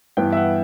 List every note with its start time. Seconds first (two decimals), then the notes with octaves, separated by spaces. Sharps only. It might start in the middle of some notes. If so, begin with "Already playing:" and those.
0.17 G2 E3 B3 G5
0.32 E5
0.37 F#5